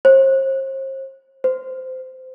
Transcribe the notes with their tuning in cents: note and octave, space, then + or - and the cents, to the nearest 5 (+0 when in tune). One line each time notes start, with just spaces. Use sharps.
C5 +40
C5 -15